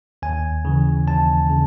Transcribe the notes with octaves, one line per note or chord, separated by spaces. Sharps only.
D#2 G#5
C#3 E3
D#2 A5
C#3